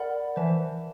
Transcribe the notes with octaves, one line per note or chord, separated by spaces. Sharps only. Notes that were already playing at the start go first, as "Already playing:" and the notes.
Already playing: A#4 D5 F#5 B5
E3 C5 E5 A5